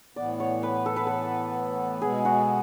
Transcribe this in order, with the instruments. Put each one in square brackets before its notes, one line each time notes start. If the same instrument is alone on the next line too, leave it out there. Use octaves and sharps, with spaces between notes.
[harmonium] A2 E3 B3 [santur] D5
[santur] C#5
B4
A4
B4
A4
[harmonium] B2 G#3 B3 [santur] G#4
[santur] F#4